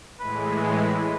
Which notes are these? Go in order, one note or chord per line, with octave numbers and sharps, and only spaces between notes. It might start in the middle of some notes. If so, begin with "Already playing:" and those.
A2 E3 G#3 B4